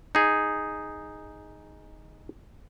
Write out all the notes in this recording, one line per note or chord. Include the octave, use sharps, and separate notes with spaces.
D#4 G#4